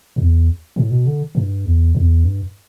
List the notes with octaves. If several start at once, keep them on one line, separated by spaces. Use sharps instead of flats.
E2
A2
B2
D3
G2
E2
E2
G2